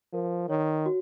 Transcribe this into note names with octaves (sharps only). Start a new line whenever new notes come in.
F3 A#4
D#3 C#5
F#4